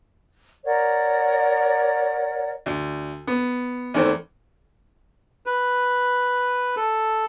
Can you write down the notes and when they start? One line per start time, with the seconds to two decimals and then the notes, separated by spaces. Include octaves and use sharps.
0.65 A#4 C#5 D5 F#5
2.66 D2
3.27 B3
3.94 E2 D#3 A3 C4
5.46 B4
6.77 A4